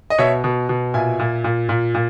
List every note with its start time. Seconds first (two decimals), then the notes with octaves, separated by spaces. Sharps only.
0.10 D#5
0.18 B2 C#5 E5
0.44 B2
0.69 B2
0.94 A#2 E5 G#5
1.19 A#2
1.44 A#2
1.69 A#2
1.94 A#2